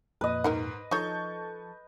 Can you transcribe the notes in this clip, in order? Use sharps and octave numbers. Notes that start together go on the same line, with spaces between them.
F2 A#2 B4 D#5
G#2 D#3 A#4 F#5
F3 D#4 A4 C#5 A5 C#6 G6